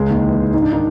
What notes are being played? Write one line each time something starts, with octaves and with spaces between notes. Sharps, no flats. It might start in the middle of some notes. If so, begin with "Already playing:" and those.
Already playing: C#2 C#3 G#3 G#4
D#2
E3
D#2
G#2 D#4
D4
D#3 D#4